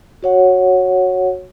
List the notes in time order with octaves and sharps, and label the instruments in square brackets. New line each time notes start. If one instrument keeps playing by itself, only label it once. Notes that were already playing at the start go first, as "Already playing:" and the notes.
[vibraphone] F#4 C#5 F#5